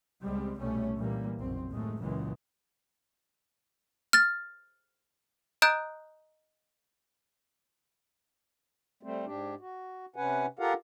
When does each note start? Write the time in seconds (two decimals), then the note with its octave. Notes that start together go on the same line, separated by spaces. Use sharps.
0.22 C#2 G3 G#3 C4
0.59 C2 B2 G3 A3 C#4
0.97 A#2 E3 G3 A#3
1.39 F#1 B1 C4
1.70 D#2 A2 G#3 A3
1.99 C#2 F#2 A#2 C#3 E3 G#3
4.13 F6 A6
5.62 D#5 A#5 D#6 F#6 G6 D7
9.03 G3 A3 C4
9.26 G#2 D4 G4
9.60 F#4
10.16 C3 C#4 B4 F#5 G#5
10.59 F4 G4 A4 A#4 F5 F#5